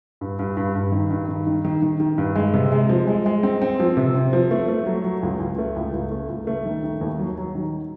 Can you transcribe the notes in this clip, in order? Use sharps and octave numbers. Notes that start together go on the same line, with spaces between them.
G2
G2
G2
G2
D#3
G2
D#3
D#3
D#3
D#3
D#3
G2
G#3
C3
G#3
F3
G#3
G#3
C4
C4
F3
C3
C4
F3
A3
A3
F#3
F#3
C#2
C#2
A3
C#2
C#2
A3
C#2
A3
D#3
D#3
D#2
F#3
F#3
D#3